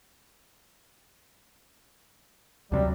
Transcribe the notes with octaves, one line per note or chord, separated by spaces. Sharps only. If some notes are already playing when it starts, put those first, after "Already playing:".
D2 C3 F#3 G3